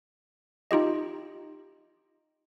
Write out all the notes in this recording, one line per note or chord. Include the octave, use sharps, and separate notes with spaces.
D#4 F4 G4 D#5